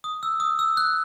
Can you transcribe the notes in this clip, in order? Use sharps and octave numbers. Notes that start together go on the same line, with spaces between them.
D#6
E6
D#6
E6
F#6